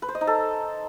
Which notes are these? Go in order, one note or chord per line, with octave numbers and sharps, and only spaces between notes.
B4
C5
D#5
D#4
A4